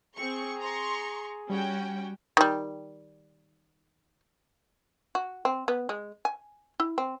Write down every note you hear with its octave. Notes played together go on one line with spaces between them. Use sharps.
C4 G#4 C#6
A#5 C6 C#6
G3 C#4 F#4 G5
D#3 G3
F#4
C4
B3
G#3
G#5
E4
C4